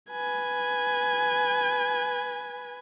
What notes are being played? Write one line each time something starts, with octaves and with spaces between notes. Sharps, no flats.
B4 G#5